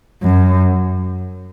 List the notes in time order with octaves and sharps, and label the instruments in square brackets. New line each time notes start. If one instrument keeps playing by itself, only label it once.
[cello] F#2